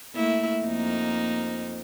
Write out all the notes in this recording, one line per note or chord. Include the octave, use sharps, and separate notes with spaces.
A3 A#3 E4
F2 A#3 D#4